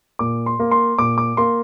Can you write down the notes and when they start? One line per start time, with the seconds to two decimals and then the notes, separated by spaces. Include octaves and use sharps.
0.19 A#2 D6
0.46 C6
0.60 A#3
0.71 C6
0.99 A#2 D6
1.18 D6
1.37 A#3 C6